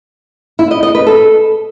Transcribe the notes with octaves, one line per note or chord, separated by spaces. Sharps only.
E4
D#5
D#5
B4
A4